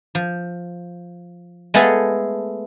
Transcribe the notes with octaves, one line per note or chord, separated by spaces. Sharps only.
F3
G#3 A3 B3 G#4 A4 F5